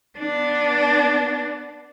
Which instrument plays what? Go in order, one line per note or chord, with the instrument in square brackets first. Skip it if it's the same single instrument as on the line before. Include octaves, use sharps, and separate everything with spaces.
[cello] B3 D4